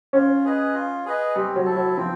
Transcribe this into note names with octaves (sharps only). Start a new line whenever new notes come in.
C#4 F4
G#4 B4 D#5
F4
G#4 B4 D#5
G3 C4
F#3
E4 A4
F#3
F3 C4